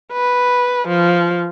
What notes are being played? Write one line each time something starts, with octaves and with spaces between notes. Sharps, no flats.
B4
F3